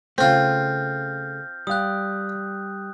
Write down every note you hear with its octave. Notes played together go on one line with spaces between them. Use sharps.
C#3 A3 C4 F4 F6 G6
G3 F5 D#6 F#6